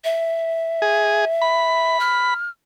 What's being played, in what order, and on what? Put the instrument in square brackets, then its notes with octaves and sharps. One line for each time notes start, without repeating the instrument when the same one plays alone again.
[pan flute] E5
[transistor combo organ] G#4
B5
[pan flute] F6